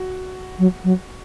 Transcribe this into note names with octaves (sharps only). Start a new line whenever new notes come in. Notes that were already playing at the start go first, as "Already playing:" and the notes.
Already playing: F#4
F#3
F#3